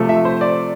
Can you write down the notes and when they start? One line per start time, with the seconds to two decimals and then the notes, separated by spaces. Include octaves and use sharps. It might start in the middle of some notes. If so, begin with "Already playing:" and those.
Already playing: C3 F3 A3
0.09 E5
0.25 C5
0.41 D5